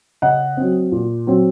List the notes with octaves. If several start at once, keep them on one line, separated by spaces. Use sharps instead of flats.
C#3 D#5 F#5
F#3 C4
A#2
F#3 C4